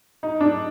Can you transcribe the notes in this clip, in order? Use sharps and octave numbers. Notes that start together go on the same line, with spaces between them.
D#4
D4